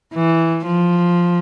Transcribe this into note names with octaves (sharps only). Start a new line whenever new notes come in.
E3
F3